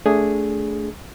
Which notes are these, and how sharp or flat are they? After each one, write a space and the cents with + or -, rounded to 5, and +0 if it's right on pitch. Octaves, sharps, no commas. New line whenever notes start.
A3 +0 D4 -25 G#4 +0